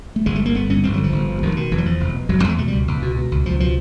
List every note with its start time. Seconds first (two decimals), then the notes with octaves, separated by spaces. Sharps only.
0.16 A3
0.26 G1 G#3
0.36 A3
0.41 D3 A#3
0.55 G1 B3
0.70 G2 C#4
0.83 G1 C4
0.94 F#3
0.98 D3
1.04 F3
1.13 G1
1.28 G2
1.42 F1 D#3
1.57 B2 D#3
1.71 F1 E3
1.78 F#3
1.86 E2 F3
2.00 F1
2.15 B2
2.29 F1 F#3
2.39 G3
2.44 E2 G#3
2.58 B2 A3
2.68 C#2 G3
2.88 C#2
3.02 B2
3.17 B2
3.31 C#2
3.45 C#2 F3
3.60 B2 F3